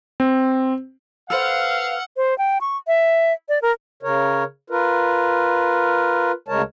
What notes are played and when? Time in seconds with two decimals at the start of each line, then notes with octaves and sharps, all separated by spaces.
0.20 C4
1.30 A4 B4 C5 F5 F#5 E6 F6
2.17 C5
2.38 G5
2.61 C#6
2.87 E5
3.49 D5
3.62 A#4
4.03 C#3 A#4 C#5
4.70 F4 A#4 B4
6.48 D2 C#3 G#3 A#4 C#5 A5